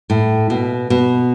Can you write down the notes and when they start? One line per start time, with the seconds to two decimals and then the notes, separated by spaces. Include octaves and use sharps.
0.10 A2
0.50 B2
0.90 B2